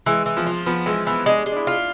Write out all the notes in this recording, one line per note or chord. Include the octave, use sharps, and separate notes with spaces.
E3 G#3
E3
F3
F4
F3 B3
E3 G#3
E3 B3
G#3 D4
G#3
D4
E4
F4